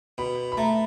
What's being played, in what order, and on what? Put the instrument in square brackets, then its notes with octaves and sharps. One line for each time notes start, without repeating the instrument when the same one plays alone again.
[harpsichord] B2 [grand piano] B5
[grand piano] B5
[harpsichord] A3 [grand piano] A#5